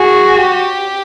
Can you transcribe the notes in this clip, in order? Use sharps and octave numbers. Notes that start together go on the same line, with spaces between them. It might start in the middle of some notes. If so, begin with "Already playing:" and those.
Already playing: F#4 G#4
G4